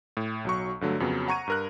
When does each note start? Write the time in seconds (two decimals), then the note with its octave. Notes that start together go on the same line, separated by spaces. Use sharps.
0.17 A2
0.45 B1 F#3 C#6
0.81 G2 D3 F#3 A3
1.00 F2 C#3 F#3 B3
1.28 F#5 A#5 C#6 G#6 D#7
1.48 G2 A#4 F#6